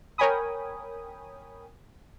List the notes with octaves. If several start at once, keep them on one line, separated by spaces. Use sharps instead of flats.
A#4 C#5 G5 G#5 B5 D#6